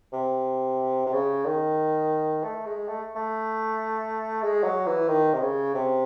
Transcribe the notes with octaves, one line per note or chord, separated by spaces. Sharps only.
C3
C3
C#3
D#3
A3
G#3
A3
A3
G#3
F#3
E3
D#3
C3
C#3
C3